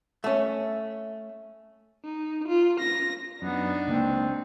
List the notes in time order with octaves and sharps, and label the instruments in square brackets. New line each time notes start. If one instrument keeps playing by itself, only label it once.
[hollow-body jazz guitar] A3 C#4
[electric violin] D#4
F4
A#6
[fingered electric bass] F#2 [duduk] B3 [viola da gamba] D4 D#4
[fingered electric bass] C#2 A#3 [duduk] C4